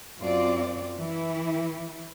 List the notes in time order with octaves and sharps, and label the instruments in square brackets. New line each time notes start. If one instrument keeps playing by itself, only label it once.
[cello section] F#2 C4 F4 D5
E3 E4